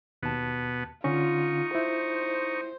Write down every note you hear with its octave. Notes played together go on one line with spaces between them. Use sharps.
D#2 B2 B3 A5
D3 C#4 D#4 F4 C#6
E4 C5